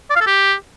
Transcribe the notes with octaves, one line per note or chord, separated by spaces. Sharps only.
D5
F5
A4
G4